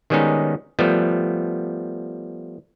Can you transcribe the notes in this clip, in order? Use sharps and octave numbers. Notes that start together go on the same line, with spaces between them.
D#3 G3 G#3 B3 C#4 D#4
F3 G3 A3 B3